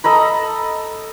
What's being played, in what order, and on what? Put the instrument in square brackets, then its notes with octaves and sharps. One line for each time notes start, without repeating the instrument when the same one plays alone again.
[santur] A4 D#5 A#5 B5